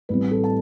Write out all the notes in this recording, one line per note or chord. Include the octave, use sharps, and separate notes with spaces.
A1 A2 G3 C4 B4
A4
A5